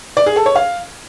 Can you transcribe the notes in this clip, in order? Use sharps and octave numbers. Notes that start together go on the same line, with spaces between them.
D5
G#4
A4
C#5
F5